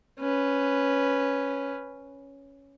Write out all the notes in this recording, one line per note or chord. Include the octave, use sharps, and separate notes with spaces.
C#4 B4